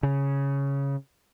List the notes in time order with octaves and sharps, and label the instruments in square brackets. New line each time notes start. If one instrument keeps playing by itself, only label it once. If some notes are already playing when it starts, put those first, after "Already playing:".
[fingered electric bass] C#3